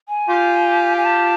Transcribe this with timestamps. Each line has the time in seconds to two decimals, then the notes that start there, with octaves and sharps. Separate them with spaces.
0.09 G#5
0.28 F4 G4
0.97 G#5
1.05 A5